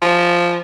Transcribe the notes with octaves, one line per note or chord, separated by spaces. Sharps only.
F3